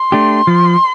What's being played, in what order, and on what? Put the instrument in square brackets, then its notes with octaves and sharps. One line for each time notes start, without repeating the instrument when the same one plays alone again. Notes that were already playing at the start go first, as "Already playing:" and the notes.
Already playing: [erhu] C6
[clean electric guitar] A3 D4 G4
F3